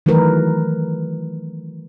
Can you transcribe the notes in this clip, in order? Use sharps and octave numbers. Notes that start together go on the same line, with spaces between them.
D#3 E3 F#3 A3 A#4 B4